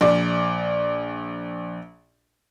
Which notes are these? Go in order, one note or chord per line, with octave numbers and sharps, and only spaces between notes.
A#1 D5